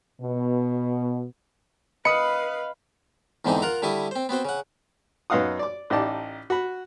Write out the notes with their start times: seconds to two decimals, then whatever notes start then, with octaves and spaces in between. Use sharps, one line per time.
0.21 B2
2.05 B4 D#5 F5 B5 D#6 C#7
3.45 E2 G#2 D3 E3 C4 D#4
3.62 F4 A#4 F#5 A#5
3.82 D3 G3 E4 C#6 D#6
4.11 C4 C5
4.29 B3 C4 F#4 C5
4.45 C#3 F#5
5.30 F#2 B3 D#4 F5 F#5 D#6
5.59 D5 D6
5.90 A1 D#4 G4 D5 A5
6.50 F#4 B5